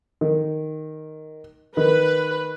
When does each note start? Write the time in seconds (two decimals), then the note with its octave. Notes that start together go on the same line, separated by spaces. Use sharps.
0.21 D#3
1.77 D#3 B4